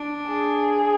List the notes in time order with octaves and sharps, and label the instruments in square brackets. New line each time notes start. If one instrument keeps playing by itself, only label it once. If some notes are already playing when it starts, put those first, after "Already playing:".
Already playing: [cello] D4
[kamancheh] G#4